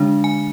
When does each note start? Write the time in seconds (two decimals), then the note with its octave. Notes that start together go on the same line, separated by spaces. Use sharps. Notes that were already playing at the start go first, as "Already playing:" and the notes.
Already playing: D3 G#3 D4
0.24 G#5